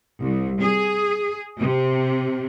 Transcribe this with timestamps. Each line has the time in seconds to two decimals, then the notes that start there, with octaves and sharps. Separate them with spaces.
0.21 C2
0.61 G#4
1.61 C3